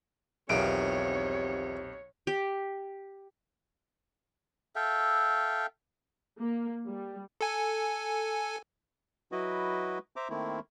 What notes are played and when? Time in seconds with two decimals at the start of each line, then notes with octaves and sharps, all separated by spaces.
0.49 B1 E2 D#3 F3 C4 G4 C#5 D7
2.27 G4
4.76 A4 E5 F5 G5
6.39 A#3
6.89 G3
7.41 A4 G#5
9.32 F#3 E4 F#4 B4 D#5
10.16 C5 E5 A#5 D6
10.30 D#3 A3 A#3 C4 E4